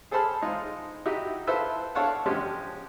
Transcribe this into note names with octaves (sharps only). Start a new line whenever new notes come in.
G#4 A4 C5 A5 B5 F6
G#3 D#4 F4
D#4 E4 F#4 G4 E5
E4 F4 A4 B4 C5 E5
D4 A4 C#5 F5 F#5 A5
F3 G#3 C#4 D4 G4